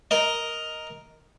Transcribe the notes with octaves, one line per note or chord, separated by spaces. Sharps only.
A#4 D#5